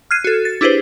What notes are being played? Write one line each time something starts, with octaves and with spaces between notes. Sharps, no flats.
F6 F#6 G#6 C7 D#7
F#4 A4
A6
D4 E4 G4 G#4 B4 C5